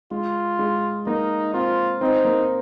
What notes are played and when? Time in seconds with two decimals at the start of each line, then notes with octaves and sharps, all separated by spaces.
0.11 G#3 F4
0.59 G#3
1.06 A#3 D#4
1.54 C4 F4
2.01 C4 D#4
2.25 A#3